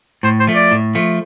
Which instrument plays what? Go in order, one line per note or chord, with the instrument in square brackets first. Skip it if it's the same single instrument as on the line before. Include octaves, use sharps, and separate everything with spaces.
[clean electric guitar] A2 [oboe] C5
[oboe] C5
[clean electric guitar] F3 A3
[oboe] D5
[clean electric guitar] A2
F3 A3